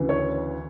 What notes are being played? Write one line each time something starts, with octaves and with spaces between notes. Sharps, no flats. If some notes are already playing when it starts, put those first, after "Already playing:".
Already playing: D2 C#3 E3
C#5